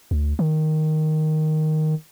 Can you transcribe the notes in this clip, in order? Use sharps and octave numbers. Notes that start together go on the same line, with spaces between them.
D2
D#3